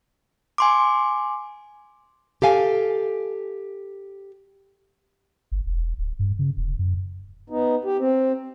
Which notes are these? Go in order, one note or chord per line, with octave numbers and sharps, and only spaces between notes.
G#5 C6 D6
G4 A4 F5 G#5
G1
E1
D1
G2
C#3
D#1
F#2
B3 D#4
G4
C4